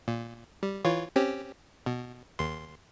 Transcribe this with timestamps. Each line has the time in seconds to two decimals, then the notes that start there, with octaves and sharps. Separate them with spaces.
0.08 A#2
0.63 G3
0.85 E3 F4 C#5
1.16 C4 C#4 G4
1.86 B2
2.39 D#2 C6